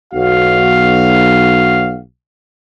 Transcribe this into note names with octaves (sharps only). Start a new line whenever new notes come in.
B1 F#4 F5